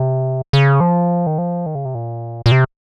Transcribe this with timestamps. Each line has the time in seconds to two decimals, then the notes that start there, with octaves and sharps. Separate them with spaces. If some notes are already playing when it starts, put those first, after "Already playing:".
Already playing: C3
0.53 C#3
0.81 F3
1.27 D#3
1.38 F3
1.66 D#3
1.75 C#3
1.85 C3
1.95 A#2
2.46 A#2
2.52 C3